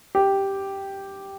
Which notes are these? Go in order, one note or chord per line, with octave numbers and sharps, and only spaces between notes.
G4